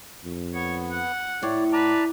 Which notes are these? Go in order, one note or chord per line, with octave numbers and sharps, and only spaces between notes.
F2
B3 C#5
F#5
A2 E4 C#5 D5
B4 D5 A5 A#5